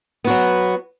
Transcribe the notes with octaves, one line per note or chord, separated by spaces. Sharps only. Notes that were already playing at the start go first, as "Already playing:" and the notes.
F#3 B3 F#4